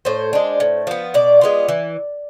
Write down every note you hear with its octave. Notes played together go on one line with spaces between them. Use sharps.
A2 C5
G#3 D4
A2
F3 B3
B2 D5
G#3 B3 F4
E3